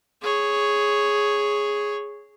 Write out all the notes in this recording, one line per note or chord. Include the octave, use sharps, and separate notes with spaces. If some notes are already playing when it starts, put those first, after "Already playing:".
G#4 C#5